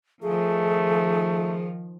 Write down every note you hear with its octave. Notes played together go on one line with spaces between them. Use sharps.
D#3 F3 A3 G#4